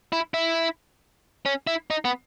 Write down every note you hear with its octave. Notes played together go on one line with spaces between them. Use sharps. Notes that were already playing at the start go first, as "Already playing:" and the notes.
E4
E4
C#4
E4
D#4
B3